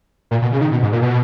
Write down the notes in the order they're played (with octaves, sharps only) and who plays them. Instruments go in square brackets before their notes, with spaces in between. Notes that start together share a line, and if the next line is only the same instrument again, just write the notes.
[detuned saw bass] A#2
B2
C#3
D#3
B2
G#2
A#2
B2